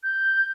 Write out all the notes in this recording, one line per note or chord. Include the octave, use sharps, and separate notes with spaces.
G6